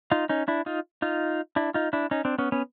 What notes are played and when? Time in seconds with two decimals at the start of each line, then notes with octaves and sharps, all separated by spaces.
0.11 D#4 F4
0.29 C#4 D#4
0.48 D4 E4
0.66 D#4 F4
1.02 D#4 F4
1.56 D4 E4
1.74 D#4 F4
1.93 D4 E4
2.11 C#4 D#4
2.25 C4 D4
2.38 B3 C#4
2.52 B3 C#4